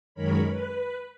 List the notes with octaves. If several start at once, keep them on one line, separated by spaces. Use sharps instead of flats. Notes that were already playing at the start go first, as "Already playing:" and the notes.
F#2 D#3 G#3 A#4 C#5 B5
B4